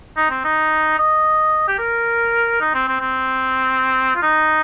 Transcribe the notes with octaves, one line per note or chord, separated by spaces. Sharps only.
D#4
C4
D#4
D#5
G4
A#4
D#4
C4
C4
C4
F4
D#4